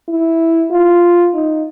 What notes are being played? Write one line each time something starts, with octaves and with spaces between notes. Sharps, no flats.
E4
F4
D#4